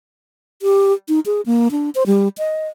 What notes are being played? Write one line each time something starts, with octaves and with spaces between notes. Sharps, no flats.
G4
D#4
G#4
A#3
D4
C5
G3
D#5